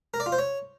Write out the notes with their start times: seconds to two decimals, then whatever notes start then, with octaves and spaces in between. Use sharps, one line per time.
0.14 A#4
0.20 D5
0.26 F4
0.32 C5
0.38 C#5